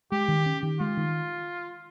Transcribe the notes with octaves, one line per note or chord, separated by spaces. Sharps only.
G#3 G4
D#3
C#4
D#3
G#3 F4
D#3